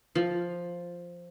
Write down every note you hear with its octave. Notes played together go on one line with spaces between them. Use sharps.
F3